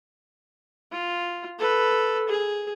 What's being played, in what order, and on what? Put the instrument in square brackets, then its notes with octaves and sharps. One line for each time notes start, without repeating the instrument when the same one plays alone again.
[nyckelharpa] F4
A4 B4
G#4